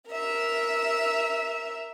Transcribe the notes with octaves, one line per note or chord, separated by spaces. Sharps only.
A#4 E5